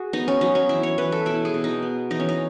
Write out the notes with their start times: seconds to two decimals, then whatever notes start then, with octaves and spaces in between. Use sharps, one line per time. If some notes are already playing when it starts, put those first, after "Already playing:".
Already playing: F#4 G#4
0.13 B3 D#4
0.28 C#4
0.41 F#3 D#4
0.55 C#4
0.69 E3 E4
0.83 C#5
0.98 E3 B4
1.12 A4
1.26 B2 E4
1.45 G#4
1.54 B2
1.64 D#4
1.83 B3
2.10 E3 D#4
2.20 C#4
2.29 D#4